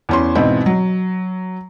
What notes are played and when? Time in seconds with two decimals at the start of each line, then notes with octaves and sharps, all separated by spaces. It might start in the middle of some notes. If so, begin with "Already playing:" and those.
0.09 E2 C#4 C6
0.35 G#2 B2 E3 C4 E4
0.66 F#3